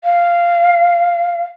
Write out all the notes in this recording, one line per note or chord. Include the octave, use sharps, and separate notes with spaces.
F5